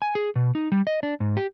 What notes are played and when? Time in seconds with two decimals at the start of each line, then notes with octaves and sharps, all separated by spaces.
0.02 G#5
0.15 G#4
0.36 B2
0.55 D#4
0.72 G3
0.87 D#5
1.03 D4
1.20 G#2
1.37 G4